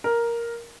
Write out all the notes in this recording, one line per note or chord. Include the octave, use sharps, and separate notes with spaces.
A#4